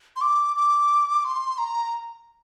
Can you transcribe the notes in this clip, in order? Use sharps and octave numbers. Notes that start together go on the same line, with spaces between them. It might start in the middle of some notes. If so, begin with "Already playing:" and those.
C6
D6
D6
C6
A#5